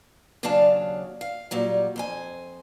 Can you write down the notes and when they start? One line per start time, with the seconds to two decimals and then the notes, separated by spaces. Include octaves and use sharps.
0.43 D#2 C#3 F#3 D4 F5 A5
1.21 F5
1.51 A#2 F#3 G3
1.96 F2 C5 G#5